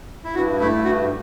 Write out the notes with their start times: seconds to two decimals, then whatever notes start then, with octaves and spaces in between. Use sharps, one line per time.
0.24 E4
0.35 G2 F#4
0.60 A3 E4
0.84 G2 F#4